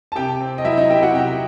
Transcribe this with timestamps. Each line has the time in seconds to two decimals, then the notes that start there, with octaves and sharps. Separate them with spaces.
0.12 A5
0.16 C3 G4 G5
0.41 C4
0.58 D#5
0.65 F#3 E4 E5
0.77 D#4 D#5
0.90 E4 G4 G5
1.02 F#4 F#5
1.14 C3 G4 G5